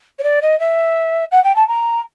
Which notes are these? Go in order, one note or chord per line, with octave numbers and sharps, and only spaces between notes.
C#5
D5
D#5
E5
F#5
G5
A5
A#5